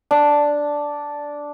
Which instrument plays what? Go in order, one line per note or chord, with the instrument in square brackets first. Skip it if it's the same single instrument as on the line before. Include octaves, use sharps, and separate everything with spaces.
[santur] D4